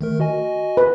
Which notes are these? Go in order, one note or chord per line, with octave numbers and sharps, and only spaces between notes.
D#3 A3 A#4
F#4 D#5 G#5
B4